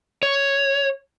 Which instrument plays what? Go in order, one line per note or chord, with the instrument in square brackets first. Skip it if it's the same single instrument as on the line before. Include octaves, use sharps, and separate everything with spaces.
[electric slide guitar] C#5